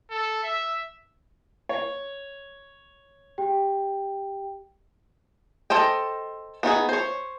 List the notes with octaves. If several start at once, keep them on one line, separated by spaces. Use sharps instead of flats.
A4
E5
C#5
G4 G5
A4 C5 D#5 G5
B3 D#4 F4 G#4
C5 C#5